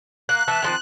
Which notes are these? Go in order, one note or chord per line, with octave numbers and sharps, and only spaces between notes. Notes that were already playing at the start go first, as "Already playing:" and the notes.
A#3 F#6
E3 E5 A5
D#3 F3 C4